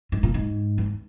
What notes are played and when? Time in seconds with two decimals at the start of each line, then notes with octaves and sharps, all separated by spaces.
0.12 G#2
0.23 A#2
0.34 G#2
0.78 E2